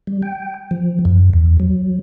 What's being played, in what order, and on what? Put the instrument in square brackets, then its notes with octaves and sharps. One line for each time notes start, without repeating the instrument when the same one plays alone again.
[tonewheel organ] G3
G5
F3
F#2
E2
F#3